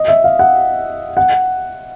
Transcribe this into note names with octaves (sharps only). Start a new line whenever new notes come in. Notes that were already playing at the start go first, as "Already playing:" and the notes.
Already playing: D#5
E5
F5
F#5
F#5